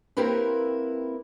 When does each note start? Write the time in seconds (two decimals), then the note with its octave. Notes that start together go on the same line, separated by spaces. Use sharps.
0.17 A#3 C4 E4 G4 A#4 B4